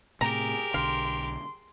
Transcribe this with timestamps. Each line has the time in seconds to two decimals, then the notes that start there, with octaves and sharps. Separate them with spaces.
0.21 A2 C3 G4 G#4 A#4 A#5
0.74 B1 D3 F5 C6